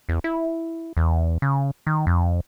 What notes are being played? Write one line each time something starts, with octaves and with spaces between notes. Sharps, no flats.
E2
E4
E2
C#3
D#3
F2